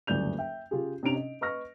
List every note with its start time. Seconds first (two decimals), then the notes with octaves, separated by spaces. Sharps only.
0.07 F#1 D2 G2 D5 G6 F7
0.38 E5 G5
0.71 C#3 F4 G4 G#4
1.03 C3 C#4 D4 A#5 D7 F7
1.15 D#5
1.41 B4 D#5 C#6 F6 A#6